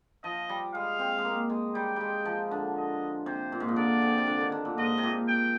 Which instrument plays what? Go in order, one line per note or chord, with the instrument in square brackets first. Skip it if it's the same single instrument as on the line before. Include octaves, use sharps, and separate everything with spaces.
[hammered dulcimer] F3 [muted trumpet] D#5
[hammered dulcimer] G3
[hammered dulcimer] G#3 [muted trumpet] F5
[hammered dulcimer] C4
G#3
A#3
G#3
[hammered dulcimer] G3 [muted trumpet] G5
[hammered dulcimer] G3 G#3
F3
D3
[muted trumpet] D#5
[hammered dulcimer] C3 [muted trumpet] C5
[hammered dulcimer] A#2
G#2
A#2
[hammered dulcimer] D3 [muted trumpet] D5
[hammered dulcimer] C3
C3
D3
D#3
D3
A#2
[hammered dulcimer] G#2 [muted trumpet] D#5
[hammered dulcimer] C3
A#2
[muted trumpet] G5